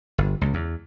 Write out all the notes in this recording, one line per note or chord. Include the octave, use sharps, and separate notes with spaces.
G1
C#2
E2